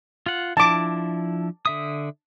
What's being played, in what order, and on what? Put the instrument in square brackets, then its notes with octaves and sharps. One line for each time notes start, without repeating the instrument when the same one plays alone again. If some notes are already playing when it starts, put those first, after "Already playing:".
[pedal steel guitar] F4 F#5
[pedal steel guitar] F3 D4 E4 [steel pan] A5 D6
[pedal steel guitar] D3 E5 D#6